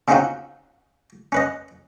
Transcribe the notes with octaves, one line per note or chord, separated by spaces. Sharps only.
C#3 C4 C#4 D#4 F4 F#4
C#4 B4 D#5